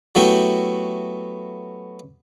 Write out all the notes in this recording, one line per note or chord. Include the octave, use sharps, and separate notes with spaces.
F#3 A3 B3 E4 F#4 G4